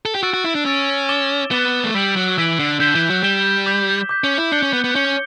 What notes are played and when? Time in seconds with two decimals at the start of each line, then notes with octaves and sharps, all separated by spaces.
0.05 A4
0.15 G4
0.23 F#4 E6 A6 D7
0.34 F#4
0.44 E4
0.55 D4
0.65 C#4 E6 A6 D7
1.09 D6 A6 E7 G7
1.51 B3 D6 A6 E7 G7
1.84 A3
1.95 G3 E6 B6 D7 F#7
2.16 F#3
2.38 E3 E6 B6 D7 F#7
2.59 D3
2.80 D3 G6 B6 E7 G7
2.95 E3
3.09 F#3
3.23 G3 G6 B6 E7 G7
3.66 D6 G6 B6
4.09 D6 G6 B6
4.24 C#4
4.38 E4
4.52 D4 G6 C#7 G7
4.63 C#4
4.73 B3
4.84 B3
4.95 C#4 G6 C#7 G7